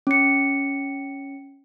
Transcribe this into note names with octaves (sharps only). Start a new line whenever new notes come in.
C#4 C#7